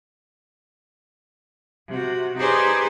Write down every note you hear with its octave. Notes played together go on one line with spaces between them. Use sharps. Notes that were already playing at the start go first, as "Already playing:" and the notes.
C3 F#4
D#4 G4 G#4 B4 C5 D5